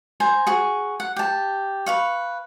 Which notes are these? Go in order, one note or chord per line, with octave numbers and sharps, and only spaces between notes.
C5 G#5 A#5
F#4 G#4
F#5
G4 A5
B4 F5 C#6